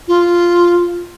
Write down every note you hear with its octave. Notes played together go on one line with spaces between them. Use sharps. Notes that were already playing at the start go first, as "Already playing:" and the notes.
F4